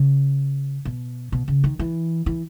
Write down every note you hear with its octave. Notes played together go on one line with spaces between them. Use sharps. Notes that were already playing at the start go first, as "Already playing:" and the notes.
Already playing: C#3
B2
B2
C#3
D#3
E3
E3